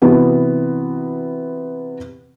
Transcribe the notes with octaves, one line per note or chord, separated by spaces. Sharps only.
C3 E3 B3 F#4